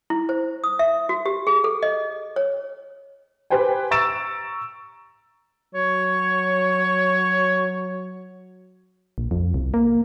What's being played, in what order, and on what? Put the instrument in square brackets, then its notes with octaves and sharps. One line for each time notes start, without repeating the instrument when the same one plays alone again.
[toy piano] E4
C5
D#6
E5
F#4
G4
G#4
A4
D#5
C#5
[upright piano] G4 B4 C5 G5 G#5
A#5 C#6 E6 A6 D7 E7
[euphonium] F#3 [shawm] C#5
[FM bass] A#1
F2
C2
A#3